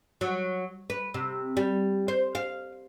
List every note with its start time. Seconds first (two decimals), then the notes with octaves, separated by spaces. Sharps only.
0.21 F#3
0.90 B4
1.14 C3
1.57 G3
2.08 C5
2.35 F5